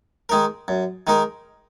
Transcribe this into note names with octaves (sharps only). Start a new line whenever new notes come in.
D#3 G#3 D#4 A#4
F#2
D#3 G#3 D#4 A#4